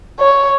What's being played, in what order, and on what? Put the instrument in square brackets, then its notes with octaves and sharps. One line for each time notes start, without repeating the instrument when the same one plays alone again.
[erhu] C#5